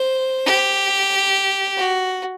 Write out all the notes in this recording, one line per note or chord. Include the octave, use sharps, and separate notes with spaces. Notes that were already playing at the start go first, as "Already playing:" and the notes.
Already playing: C5
G4
F#4